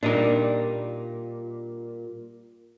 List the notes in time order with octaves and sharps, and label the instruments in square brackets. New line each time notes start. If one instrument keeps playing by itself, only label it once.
[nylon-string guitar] A#2 G3 [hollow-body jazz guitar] D4 D#4 A#4